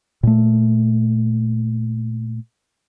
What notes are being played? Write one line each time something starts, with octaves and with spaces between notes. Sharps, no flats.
A#2 A3